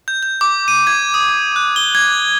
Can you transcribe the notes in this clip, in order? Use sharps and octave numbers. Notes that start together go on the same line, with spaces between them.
G6
G6
D6
D#7
G#6
D#6
F#6
G7
G#6